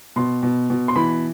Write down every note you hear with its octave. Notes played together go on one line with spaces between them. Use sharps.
B2 C6
B2
B2
C6
E3 B5